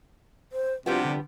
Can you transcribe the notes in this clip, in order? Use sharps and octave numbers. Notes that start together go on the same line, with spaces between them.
C5
C3 F3 G3 B3 D4 F4 F#4
D3